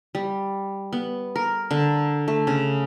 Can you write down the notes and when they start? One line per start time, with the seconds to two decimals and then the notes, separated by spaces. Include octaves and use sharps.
0.15 G3
0.93 B3
1.36 A#4
1.71 D3
2.28 A3
2.47 C#3